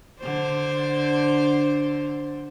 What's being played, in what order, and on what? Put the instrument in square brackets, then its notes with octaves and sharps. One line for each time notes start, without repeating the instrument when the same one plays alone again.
[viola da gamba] D3 D4 C5